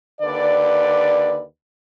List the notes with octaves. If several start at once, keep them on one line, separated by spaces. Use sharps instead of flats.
D#2 D3 B4 D5